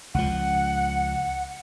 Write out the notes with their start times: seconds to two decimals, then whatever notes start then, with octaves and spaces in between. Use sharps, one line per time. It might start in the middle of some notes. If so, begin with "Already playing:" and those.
0.14 C#2 F3 F#5